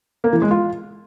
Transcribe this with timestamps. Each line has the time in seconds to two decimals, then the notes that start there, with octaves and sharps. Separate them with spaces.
0.24 A#3
0.33 E3
0.42 G#3
0.51 F4